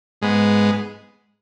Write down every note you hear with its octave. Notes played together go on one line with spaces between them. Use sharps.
G#2 G#3 B3